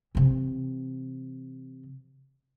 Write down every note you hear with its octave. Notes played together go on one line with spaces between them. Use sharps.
C3 E3